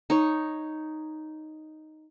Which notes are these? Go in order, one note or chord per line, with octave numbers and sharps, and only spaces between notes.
D#4 C#5